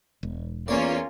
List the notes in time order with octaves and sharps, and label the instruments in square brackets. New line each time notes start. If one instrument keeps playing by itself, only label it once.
[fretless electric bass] E1
[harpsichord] E2 C#5 D5 [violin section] A#3 C#4 F4